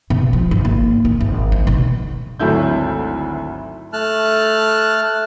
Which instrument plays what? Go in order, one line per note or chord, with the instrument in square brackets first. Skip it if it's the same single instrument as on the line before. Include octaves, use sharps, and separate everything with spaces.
[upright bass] B2
F3
G#1
A#3
A#2
G#1
D#4
B2
[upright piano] G#1 D2 F#3 A3 E4 G6
[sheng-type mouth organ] A3 A5 F6 F#6